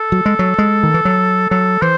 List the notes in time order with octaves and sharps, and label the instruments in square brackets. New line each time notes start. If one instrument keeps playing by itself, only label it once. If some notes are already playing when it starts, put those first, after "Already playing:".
Already playing: [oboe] A4
[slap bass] F#3
G#3
F#3
G#3
D#3
E3
F#3
[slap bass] F#3 [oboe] A4
[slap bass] E3 [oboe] C5